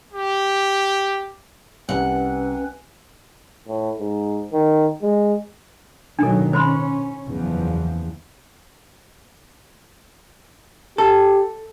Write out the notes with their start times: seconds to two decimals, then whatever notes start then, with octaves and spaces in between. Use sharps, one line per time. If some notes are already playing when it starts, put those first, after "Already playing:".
0.12 G4
1.89 C2 C4 C#4 B4 F#5
3.67 A2
3.99 G#2
4.53 D#3
5.02 G#3
6.19 B2 D#3 F#3 D4 A4
6.53 C#4 C5 B5 C6
7.28 F#1 E2 F3
10.98 G4 A4